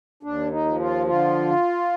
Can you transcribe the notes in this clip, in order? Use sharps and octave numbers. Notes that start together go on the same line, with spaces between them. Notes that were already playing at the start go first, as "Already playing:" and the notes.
D#2 D4
D#4
F3
F4
D3 F4